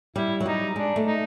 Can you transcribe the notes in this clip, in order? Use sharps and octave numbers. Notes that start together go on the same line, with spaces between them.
G3 E4
F#3
G3 D#4
G#3 D4
A3
D#4